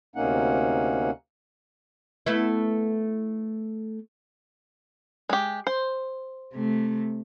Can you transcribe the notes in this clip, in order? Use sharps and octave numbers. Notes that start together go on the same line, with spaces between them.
D2 C3 A#3 C#4 D#4 F#5
A3 B3 E4
G#3 G4
C5
C3 A3